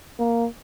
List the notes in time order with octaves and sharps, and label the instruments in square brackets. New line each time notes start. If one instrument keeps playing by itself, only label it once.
[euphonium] A#3